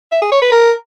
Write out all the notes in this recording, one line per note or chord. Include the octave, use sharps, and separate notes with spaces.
E5
G#4
C#5
B4
A#4